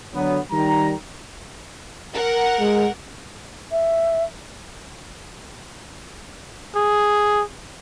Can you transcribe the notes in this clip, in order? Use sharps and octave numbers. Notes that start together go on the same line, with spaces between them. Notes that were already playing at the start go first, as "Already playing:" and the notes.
D3 F#3 B3
D#3 G3 A#5
A#4 F#5
G#3
E5
G#4